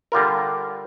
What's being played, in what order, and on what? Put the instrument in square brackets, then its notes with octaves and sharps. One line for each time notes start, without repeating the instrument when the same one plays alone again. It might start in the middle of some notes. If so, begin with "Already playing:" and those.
[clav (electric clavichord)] D3 G3 F4 A#4